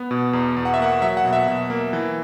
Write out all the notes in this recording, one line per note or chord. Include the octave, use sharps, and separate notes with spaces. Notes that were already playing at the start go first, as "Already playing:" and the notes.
Already playing: B3
B2
E2
E2
F#5
E5
A#3 F#5
F#3 E5
F#5
B2
E5
B2
A#3
E3